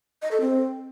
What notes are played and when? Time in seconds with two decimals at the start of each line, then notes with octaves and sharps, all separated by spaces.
0.22 D#5
0.31 A4
0.41 C4